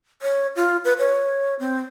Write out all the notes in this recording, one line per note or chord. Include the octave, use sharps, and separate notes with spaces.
C#5
F4
B4
C#5
C4